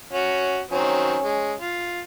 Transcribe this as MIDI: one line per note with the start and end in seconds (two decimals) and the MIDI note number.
0.13 0.60 61
0.13 0.60 66
0.71 1.17 51
0.71 1.17 54
0.71 1.17 60
0.71 1.56 61
1.24 1.53 56
1.60 2.00 65